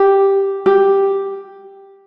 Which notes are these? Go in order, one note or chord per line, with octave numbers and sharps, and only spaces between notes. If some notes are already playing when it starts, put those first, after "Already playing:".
Already playing: G4
G4